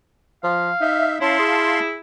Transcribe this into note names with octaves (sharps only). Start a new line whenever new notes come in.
F3 F5
D#4 E5
C#4 E4 F5 A5 C6
G#4